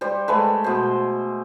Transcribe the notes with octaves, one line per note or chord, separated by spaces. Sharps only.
G3 C5
G#3 A3 B4
B2 C5